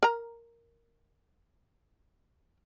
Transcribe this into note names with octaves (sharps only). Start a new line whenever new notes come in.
A#4 A#5